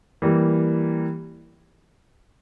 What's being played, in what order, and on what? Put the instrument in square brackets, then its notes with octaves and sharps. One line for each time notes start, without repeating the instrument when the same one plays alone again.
[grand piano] E3 G3 A#3